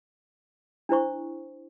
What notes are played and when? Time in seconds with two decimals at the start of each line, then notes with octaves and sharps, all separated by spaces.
0.89 D4 E4 C5 C#6